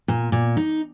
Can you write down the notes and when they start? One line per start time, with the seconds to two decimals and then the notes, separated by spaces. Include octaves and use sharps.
0.08 A#2
0.32 A#2
0.57 D#4